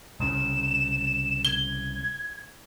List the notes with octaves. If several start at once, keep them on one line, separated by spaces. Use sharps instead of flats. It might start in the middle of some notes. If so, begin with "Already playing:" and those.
C2 C#3 E7
G#6 G7